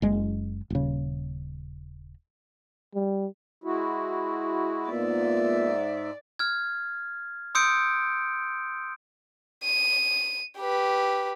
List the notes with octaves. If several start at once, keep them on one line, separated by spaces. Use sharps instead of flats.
F#1 G#3
D#1 C#3
G3
G#3 E4 F#4
G#2 A#3 B3 F4 D5 E5
F6 G#6
C6 D#6 E6 G6 C#7 D7
D#7
G4 B4